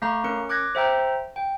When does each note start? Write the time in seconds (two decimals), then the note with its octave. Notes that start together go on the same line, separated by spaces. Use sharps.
0.02 A3 F5 A#5 C#6
0.24 C#4 A#4 C#7
0.49 D6 F#6 G#6 A#6
0.75 C5 E5 G5 A#5
1.36 G5